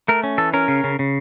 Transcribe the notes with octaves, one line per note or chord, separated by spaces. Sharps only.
A3 A#4
C#4
E3 A4
C#4 A#4
C#3
C#3
C#3